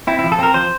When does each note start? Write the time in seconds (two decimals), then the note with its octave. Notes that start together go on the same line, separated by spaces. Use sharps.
0.07 C4 E4
0.19 E4
0.24 F3
0.32 A4
0.39 C4 A#4
0.54 F3 C5